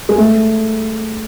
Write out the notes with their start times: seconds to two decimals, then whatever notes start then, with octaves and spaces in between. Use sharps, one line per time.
0.09 G#3
0.18 A3